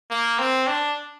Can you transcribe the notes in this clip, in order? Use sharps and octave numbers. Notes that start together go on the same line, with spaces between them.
A#3
C4
D4